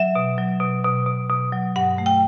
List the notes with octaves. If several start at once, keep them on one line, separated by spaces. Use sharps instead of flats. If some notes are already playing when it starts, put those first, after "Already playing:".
Already playing: F#3 E5
B2
F#3
B2
B2
B2
B2
F#3
G2 F#5
A3
G5